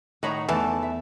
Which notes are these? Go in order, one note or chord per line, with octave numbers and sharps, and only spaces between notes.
A2 D#3 C#5 D#5 F#5 A#5 B5
E2 E3 A3 D5 A5
E5